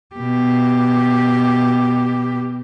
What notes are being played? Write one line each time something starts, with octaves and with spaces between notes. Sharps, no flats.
B2 G4